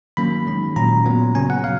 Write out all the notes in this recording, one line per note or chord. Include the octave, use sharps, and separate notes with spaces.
D#3 F#3 A#3 C#4 B5
D#3 G#3 C#4
A#2 F#3 C#4 A#5
A#2 F#3 B3
C#3 F#3 C#4 G#5
F#5
F5